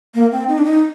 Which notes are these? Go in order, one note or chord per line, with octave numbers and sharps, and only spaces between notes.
A#3
C4
D#4
D4
D#4